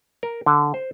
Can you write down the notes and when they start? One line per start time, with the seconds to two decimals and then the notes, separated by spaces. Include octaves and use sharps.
0.23 A#4
0.46 D3
0.74 C5